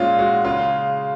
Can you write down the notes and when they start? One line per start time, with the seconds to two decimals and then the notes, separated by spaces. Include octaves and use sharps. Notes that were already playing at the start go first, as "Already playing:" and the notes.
Already playing: A#2 G#3 C#4 F4
0.19 G#3 F#4
0.45 C#3 F4